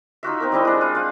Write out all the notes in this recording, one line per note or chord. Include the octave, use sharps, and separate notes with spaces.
D#4 F4 F#4 E5
C4 D#4 A#4
G3 C4 E4 D#5
G#3 D4
F4
F5 F#5